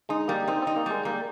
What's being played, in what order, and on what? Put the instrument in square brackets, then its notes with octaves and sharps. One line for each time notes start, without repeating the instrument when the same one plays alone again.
[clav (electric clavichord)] G#3 [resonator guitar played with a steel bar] D#4
[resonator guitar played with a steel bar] G3 [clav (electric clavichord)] A#3
[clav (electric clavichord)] C4 [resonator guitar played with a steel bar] D#4
[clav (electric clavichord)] C4 [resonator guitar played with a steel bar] D#4
[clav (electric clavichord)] A#3
[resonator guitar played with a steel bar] G3 [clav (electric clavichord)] G#3
[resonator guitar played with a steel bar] G3 [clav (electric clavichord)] A#3